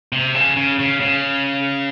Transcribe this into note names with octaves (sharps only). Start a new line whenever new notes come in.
C3
C#3
C#3
C#3
C#3